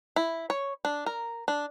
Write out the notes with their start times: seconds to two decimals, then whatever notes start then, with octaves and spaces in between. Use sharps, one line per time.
0.16 E4
0.50 C#5
0.85 D4
1.06 A#4
1.48 D4